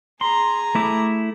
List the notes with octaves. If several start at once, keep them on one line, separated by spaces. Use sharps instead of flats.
G#4 A#5 C6
A3 E4 D6